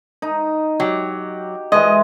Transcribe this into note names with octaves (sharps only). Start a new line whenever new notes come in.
D#4
F#3 G4
E3 G#3 D#5